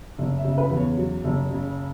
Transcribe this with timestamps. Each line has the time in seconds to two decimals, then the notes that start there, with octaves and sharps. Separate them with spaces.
0.18 F#1
0.38 E5
0.44 C#3
0.58 B4
0.70 E2
0.77 C#5
0.97 F#3
1.24 F#1
1.51 C#3